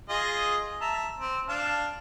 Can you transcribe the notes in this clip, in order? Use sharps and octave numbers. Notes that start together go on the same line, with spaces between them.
F4 G#4 D#5
E5 A5 A#5
C4
D4 F5 A5